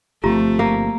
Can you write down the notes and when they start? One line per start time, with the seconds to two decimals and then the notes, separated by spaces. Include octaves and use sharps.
0.24 G1 F3 A3 C4 F4 G4 A#5
0.59 A#3